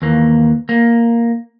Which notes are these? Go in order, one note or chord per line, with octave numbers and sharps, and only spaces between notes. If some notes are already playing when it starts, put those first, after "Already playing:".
D#2 E3 A#3
A#3